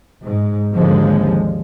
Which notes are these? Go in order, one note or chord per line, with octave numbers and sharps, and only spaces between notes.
G#2
G#1 D#2 D3 F3 G#3